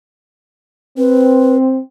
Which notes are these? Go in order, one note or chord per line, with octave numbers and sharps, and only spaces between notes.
C4 B4